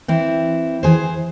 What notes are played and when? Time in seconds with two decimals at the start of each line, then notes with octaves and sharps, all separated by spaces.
0.08 E3 C4 E4
0.83 E3 G#4 C5